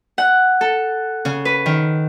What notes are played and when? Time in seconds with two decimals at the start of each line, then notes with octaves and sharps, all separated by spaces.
0.18 F#5
0.61 A4
1.25 C#3
1.45 B4
1.66 D#3